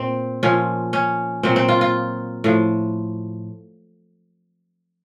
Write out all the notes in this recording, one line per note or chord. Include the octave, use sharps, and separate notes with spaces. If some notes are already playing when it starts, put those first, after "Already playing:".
Already playing: A#2 C4
A#2 F3 C#4
C#4
A#2 F#3 C4
C4
F4
F4
A2 F3